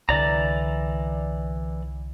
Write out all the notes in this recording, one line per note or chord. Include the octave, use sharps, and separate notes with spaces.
C2 D3 E3 D5 A#5